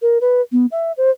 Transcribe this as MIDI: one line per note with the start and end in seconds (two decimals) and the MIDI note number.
0.02 0.18 70
0.21 0.41 71
0.52 0.66 59
0.71 0.92 76
0.97 1.10 72